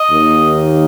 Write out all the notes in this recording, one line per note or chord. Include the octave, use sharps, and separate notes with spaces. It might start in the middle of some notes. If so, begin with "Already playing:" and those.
Already playing: D#5
D#2 D#3 A#3